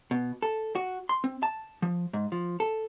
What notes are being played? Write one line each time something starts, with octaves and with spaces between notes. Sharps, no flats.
B2
A4
F#4
C6
C4
A5
F3
G#2
F3
A4